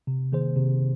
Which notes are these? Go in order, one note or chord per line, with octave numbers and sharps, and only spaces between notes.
C3
D#3 A#3 G#4 C5
C3